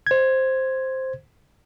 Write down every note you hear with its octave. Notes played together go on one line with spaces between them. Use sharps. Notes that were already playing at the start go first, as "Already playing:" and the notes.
C5 G#6